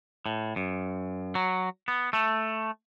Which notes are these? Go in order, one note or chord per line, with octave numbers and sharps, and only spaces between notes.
A2
F#2
F#3
B3
A3